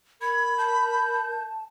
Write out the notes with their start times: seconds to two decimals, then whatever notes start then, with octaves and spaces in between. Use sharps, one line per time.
0.21 A#4 B5 G#6
0.58 A5 G6